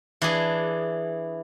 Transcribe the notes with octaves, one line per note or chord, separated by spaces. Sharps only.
E3 D4 G#4